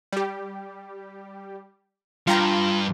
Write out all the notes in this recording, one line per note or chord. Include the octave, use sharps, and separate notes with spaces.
G3 G4
G2 F4 F5 G5 A#5